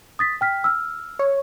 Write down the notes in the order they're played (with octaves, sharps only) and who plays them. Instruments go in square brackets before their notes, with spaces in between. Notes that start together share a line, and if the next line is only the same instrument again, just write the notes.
[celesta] D#6 A6 B6
G5 F6 B6
E6 F6
[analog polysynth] C#5